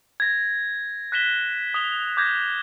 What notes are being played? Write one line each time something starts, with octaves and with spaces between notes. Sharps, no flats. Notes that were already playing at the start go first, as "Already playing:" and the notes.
G#6 A#6
F#6 A#6 B6 E7 G7
D#6 F7 G7
D6 G6 G#6 A#6